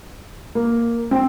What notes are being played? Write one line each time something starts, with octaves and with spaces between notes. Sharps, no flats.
A#3
C4